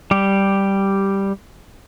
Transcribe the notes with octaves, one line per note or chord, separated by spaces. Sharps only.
G3 G4